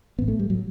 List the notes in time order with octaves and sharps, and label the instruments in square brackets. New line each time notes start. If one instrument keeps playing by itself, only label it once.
[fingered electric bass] A1 A2 B3
A3
G3
A2 F#3